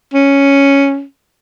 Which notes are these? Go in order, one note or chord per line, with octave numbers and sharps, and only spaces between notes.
C#4